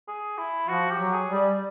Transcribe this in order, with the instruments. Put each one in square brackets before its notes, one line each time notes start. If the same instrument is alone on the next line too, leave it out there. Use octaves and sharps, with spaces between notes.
[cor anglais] G#4
E4
[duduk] F3 [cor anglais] F#4
[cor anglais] G4
[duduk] F#3
[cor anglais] G#4
[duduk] G3
[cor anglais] D5